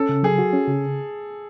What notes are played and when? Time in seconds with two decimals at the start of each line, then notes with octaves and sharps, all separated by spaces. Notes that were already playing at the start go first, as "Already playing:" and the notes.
Already playing: C#4 A4
0.09 C#3
0.23 F#3 G#4
0.39 F#4
0.53 C#4
0.68 C#3